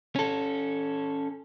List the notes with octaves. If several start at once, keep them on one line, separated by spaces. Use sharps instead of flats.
C#4 A4